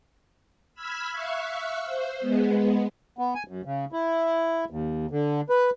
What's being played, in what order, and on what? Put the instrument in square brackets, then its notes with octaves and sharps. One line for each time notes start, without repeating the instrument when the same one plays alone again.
[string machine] B5 E6 F6 G#6 B6
E5 F5 C#6 E6 F#6
C5
G#3 B3
[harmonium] B3
G#5
F#2
C#3
E4
D#2
D3
B4